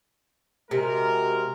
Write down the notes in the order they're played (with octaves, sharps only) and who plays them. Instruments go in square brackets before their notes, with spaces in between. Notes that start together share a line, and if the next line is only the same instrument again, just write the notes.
[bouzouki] C3 [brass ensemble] G#3 F#4 A#4